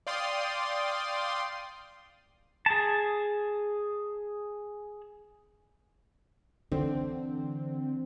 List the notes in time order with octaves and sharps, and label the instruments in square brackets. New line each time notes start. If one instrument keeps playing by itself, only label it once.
[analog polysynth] D5 F5 G5 C6 D#6
[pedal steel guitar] G#4 A5
[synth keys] D3 C4 [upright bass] E3